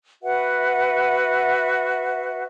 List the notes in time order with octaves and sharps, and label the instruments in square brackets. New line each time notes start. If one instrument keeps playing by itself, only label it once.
[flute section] F#4 B4 E5 F#5